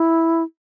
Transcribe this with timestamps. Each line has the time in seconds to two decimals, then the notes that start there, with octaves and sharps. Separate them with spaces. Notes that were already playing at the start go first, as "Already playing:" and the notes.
Already playing: E4